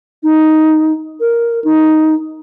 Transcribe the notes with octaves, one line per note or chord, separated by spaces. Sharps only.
D#4
A#4
D#4